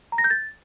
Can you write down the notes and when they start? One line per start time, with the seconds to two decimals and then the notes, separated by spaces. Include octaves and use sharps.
0.12 A#5
0.18 A#6
0.24 G6
0.30 A6